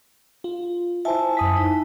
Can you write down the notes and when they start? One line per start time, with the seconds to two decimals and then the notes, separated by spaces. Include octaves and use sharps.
0.44 F4
1.05 E4 C5 E5 G#5 A5
1.37 F#2 D#6 B6
1.57 D#4